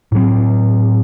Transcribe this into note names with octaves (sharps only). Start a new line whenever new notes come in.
A2 F#3 C4